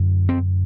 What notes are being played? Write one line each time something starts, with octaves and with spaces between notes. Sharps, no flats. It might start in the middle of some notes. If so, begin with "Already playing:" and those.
Already playing: F#2 D3
C4